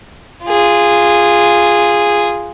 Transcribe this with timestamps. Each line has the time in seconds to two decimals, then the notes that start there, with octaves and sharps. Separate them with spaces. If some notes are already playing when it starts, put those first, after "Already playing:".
0.45 F4 G#4